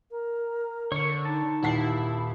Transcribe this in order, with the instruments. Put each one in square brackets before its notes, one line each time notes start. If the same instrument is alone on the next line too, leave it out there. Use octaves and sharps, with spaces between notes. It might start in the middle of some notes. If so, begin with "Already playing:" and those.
[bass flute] A#4
[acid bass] D3 [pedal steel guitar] C#5 C#6
[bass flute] D#4 [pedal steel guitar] A5
[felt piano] D#1 F#5 C7 [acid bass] E4